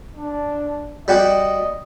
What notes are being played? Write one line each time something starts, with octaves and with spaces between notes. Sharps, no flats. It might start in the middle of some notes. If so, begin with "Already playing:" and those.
D4
G3 F#4 G4 D#5